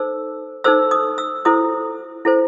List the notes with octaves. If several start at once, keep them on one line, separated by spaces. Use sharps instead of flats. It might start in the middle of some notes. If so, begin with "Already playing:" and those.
Already playing: D#4 A4 C5 E6
D#4 A4 C5 E6
D#6
E6
E4 A4 C5 D#6
E4 A4 C5